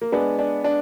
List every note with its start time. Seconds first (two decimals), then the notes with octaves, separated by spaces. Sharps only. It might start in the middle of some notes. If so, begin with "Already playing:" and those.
0.01 A#3
0.12 G#3 B3 D4
0.39 D4
0.64 D4